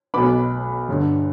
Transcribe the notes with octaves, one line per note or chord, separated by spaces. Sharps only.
B1 B2 B3 B5 D6
G1 G2 D3